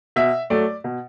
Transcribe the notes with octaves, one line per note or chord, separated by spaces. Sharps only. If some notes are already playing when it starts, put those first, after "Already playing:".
B2 E5
F#3 A3 D5
B2